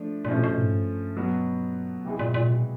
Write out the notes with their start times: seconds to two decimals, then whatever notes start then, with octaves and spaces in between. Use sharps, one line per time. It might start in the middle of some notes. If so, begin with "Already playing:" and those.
Already playing: F3 A3 D4
0.25 A#2
0.28 B2 F3 A3 C#4
0.37 A#2
0.44 B2
0.58 G#2
0.72 G2
1.16 B2 F#3 B3
2.05 C3 E3 G#3
2.19 A#2
2.34 A#2
2.49 B2